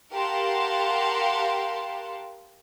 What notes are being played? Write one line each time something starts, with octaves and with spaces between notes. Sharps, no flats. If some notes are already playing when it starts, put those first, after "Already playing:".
G4 A#4 F5 F#5 A5 C6